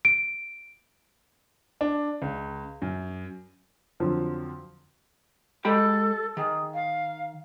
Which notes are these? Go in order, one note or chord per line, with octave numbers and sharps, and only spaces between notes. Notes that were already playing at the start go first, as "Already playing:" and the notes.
D7
D4
C#2
F#2
F2 D3 F3 F#3
G#3 G4 A4 B5
D#3 G#4
F5